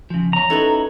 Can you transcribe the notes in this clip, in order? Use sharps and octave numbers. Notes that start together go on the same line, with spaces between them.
C#3 F3
E2 C#5 A#5
B3 C#4 D#4 E4 F#4 A4